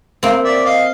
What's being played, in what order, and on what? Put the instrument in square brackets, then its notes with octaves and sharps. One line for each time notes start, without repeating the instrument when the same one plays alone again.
[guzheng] A#3 C4
[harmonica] D5 E5
D#5 F5